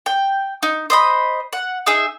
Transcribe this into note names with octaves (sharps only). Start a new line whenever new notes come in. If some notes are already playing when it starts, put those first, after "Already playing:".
G5
D#4
C5 D#5 B5
F#5
D#4 G#4 E5